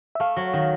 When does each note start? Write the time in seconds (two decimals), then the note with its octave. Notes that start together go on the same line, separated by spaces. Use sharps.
0.15 E5
0.20 A3 F5
0.36 F#3
0.53 D#3